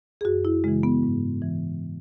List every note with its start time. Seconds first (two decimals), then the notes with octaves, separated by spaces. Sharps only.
0.21 G#4
0.25 F#2 F#4
0.45 E4
0.64 C#3 E3 G#3
0.83 B3
1.03 G#2
1.42 E3